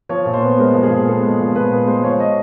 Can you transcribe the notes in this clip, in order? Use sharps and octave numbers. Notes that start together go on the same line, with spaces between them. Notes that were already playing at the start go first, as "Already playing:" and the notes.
F3 C#5
A#2
C5
B3
G#3 A#4
F3
G#4
A#2
B3 A4
G#3
F3
A#2 B4
B3 B4
G#3 C5
F3 C#5
D#5